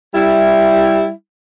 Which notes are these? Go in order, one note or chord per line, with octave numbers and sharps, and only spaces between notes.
G3 E4